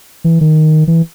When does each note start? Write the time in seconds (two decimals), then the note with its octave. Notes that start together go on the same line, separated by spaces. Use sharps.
0.24 E3
0.41 D#3
0.88 E3